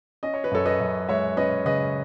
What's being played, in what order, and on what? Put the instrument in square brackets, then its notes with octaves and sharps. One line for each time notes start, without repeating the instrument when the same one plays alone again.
[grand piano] C#4 D#5
C#5
B4
F#2 A4 C#5
B4 D#5
F#2
G#3 C#5 E5
C#4 B4 D#5
C#3 B4 D#5